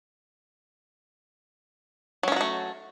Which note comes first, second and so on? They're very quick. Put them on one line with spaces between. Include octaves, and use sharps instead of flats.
F#3 C#4 F4 F#4 A3